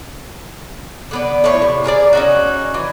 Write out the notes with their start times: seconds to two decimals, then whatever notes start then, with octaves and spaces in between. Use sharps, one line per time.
1.11 D3 B3 D5
1.44 A2 F3 E4 C#5
1.62 C3
1.84 G#4 A#4 C#5 D5
2.13 C#4 D#4 F#4
2.74 E3